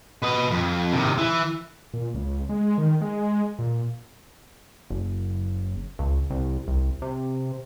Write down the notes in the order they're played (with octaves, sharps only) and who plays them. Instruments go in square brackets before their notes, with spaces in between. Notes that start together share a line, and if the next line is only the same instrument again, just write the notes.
[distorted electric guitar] B4 D#5
F2
C3 D#3
E3
[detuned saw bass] A#2
C#2
G#3
D#3
G#3
A#2
[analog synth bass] F#1
C#2
C2
C2
C3